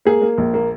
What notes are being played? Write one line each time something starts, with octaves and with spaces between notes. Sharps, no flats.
A#3 G#4
A#3
A#1
A#3